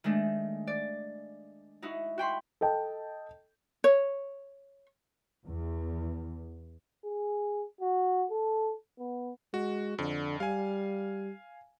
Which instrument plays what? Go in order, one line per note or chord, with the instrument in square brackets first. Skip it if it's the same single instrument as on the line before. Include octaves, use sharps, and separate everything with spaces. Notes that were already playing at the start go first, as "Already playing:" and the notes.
[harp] D#3 G#3 A3 D4
D5
D#4 E4 F#4
F#4 G5 B5 C6
[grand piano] A4 D#5 G5 A5
[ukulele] C#5
[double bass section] E2
[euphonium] G#4
F#4
A4
B3
[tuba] G#3 [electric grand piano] F#4
[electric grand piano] F2 [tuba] D3
[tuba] G3 [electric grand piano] F5 G#5